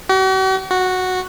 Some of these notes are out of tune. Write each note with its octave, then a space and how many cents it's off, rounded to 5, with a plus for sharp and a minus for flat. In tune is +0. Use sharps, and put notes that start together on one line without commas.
F#4 +45
F#4 -5